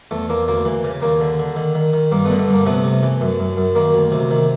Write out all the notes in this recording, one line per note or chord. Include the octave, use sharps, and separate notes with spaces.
E2 A3
E2 A#3
D2 A#3
E3
C#3
D#2 A#3
D3
D3
D#3
D#3
D#3
G2 A#3
A3 B3
D3
A3
G2
A#3
C3 A3 B3
C3
E3
F#2
F#2
F#2
D#3 A#3
D2
C3
D#3